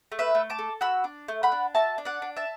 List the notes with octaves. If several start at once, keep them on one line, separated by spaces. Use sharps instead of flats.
A3
B4 E5
A3
A5 D6
A4
F#4 B5 E6
D4
A3
F#5 B5
D4
F#4 E5 A5
D4
D5 F#5
D4
E5 A5